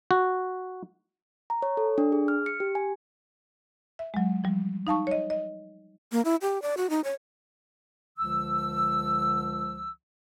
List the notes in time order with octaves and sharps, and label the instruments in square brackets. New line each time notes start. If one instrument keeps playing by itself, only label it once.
[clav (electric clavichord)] F#4
[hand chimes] A#5
C#5
A4
D4
G#4
F6
C#7
G4
G#5
[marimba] E5
F#3 G#3
F3 G3
D#4 F5 A5 C#6
C#5 D#5
D#5
[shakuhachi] A#3
E4
G4
D5
F#4
D#4
C#5
[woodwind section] C#2 D3 F3 E6